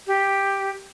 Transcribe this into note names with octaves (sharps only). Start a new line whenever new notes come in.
G4